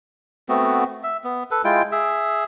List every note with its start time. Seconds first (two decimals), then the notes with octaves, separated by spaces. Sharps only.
0.49 A3 B3 C4 F#4
1.03 E5
1.24 B3
1.51 A4 B4
1.65 G#3 E4 F4 G5
1.92 G#4 E5